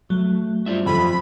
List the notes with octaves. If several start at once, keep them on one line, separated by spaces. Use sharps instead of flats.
F#3 A3
G2 F4 C5 D5 E5
F2 C4 F4 B5